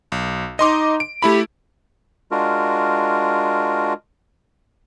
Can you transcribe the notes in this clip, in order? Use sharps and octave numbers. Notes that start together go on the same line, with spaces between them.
B1
D#4 D#5 C6 D6
D7
A3 E4 G4 B5
G#3 D4 F4 F#4 A#4